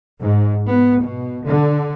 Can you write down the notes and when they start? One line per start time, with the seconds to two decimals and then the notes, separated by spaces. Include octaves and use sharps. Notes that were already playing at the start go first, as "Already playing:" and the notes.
0.20 G#2
0.68 B3
1.01 B2
1.45 D3